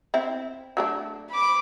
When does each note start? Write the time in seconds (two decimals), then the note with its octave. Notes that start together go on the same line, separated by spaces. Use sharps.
0.14 C4 E4
0.77 F#3 A3 D4
1.30 B5 D6